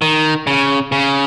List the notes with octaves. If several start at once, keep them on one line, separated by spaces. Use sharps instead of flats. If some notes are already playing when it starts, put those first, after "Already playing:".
D#3
C#3
C#3